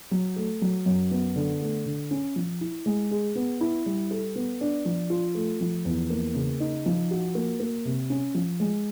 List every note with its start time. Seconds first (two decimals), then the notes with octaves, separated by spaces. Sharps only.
0.11 F#3
0.36 A3
0.62 F#3
0.86 F#2
1.11 B3
1.36 D3
1.61 A3
1.86 D3
2.11 C#4
2.36 F3
2.61 E4
2.86 G#3
3.11 G#4
3.35 B3
3.61 E4
3.86 G3
4.11 A4
4.35 B3
4.61 D4
4.85 F3
5.10 F4
5.35 A3
5.60 F3
5.85 E2
6.10 A#3
6.35 C#3
6.60 D#4
6.86 F3
7.11 F#4
7.35 A#3
7.60 A#3
7.85 C3
8.10 C#4
8.35 F3
8.60 G#3